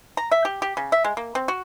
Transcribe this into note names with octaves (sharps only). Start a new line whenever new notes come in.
A#5
E5
G4
G4
C#3
E5
G#3
A#3
C4
F#4